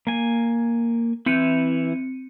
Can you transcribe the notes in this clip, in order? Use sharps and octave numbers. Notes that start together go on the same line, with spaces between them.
A#3 G#5
E3 C4 E4 C#7 D#7